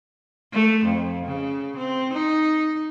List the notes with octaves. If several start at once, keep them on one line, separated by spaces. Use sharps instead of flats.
A3
F2
C#3
C4
D#4